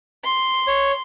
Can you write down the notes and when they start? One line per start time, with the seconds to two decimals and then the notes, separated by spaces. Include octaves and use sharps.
0.24 C6
0.68 C#5